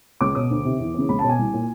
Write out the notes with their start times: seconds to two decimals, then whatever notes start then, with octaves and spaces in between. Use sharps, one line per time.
0.21 C#2 D6
0.35 B2 D#6
0.50 D2
0.65 C3 D#3
0.79 E2
0.94 C#3 E3
1.09 C#2 B5
1.19 A5
1.24 B2
1.29 G#5
1.39 C2
1.54 A#2